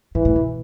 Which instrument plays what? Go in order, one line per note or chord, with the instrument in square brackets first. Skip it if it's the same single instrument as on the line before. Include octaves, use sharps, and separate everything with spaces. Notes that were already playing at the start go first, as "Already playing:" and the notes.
[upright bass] G#2 [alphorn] E3
[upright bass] A2
B2